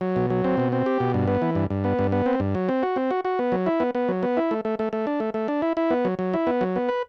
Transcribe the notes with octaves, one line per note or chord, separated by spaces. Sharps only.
F#3
B2
F#3
C4
B2
C4
G4
B2
G2
B3
E3
G2
G2
B3
G2
B3
C4
G2
F#3
C4
F#4
C4
F#4
F#4
B3
F#3
E4
B3
B3
F#3
B3
E4
A3
A3
A3
A3
D4
A3
A3
D4
E4
E4
B3
F#3
F#3
E4
B3
F#3
B3
B4